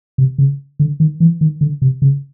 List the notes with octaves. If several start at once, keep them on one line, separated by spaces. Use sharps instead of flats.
C3
C#3
D3
D#3
E3
D#3
D3
C3
C#3